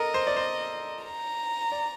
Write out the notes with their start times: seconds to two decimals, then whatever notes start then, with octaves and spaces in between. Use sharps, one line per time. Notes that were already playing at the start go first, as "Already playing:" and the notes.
Already playing: A4 A#4 D#5
0.14 C5
0.27 D5
0.37 C5
1.04 A#5
1.72 D5